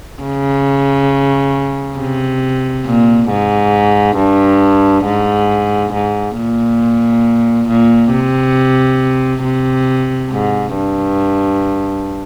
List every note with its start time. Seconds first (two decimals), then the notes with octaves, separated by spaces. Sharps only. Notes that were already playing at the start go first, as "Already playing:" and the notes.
0.23 C#3
1.98 C3
2.86 A#2
3.29 G#2
4.17 G2
5.05 G#2
5.93 G#2
6.37 A#2
7.68 A#2
8.12 C3
9.44 C3
10.31 G#2
10.75 G2